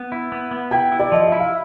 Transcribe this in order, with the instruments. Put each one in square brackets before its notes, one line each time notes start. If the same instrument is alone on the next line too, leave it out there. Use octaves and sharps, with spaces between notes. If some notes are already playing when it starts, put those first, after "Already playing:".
Already playing: [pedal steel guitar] B3
E4
B3
B3
[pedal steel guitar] E4 [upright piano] G5
[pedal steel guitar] E4
[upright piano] D5
[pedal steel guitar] F3 [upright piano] D#5
[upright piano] E5
[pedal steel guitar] E4
[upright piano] F5